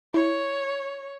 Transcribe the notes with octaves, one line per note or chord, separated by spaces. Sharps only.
E4 C#5